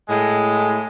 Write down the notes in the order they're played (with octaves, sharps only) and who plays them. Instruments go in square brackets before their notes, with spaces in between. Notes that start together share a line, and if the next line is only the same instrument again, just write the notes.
[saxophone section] A2 G#3